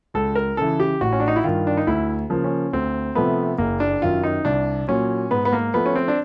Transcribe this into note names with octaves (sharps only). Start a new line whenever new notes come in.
C#2 A4
A#4
C#3 E3 A4
G4
A1 F#4
C#4
D4
D#4
E4
G2 D#3 F4
D4
D#4
D2 E4
C#3 F3 A#3
C#4
D2 C4
C3 F3 A3 B3
F#1 A#3
D4
F#2 D#3 F4
D#4
C2 D4
A#2 F#3 C#4
G#2 B3
B3
A#3
F3 A3 B3
C#4
C4
D4